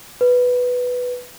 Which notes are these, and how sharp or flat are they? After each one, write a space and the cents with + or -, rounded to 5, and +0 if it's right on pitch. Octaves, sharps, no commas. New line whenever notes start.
B4 +0